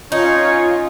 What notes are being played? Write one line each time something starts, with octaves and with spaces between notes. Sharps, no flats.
C#4 D#4 F4 C#5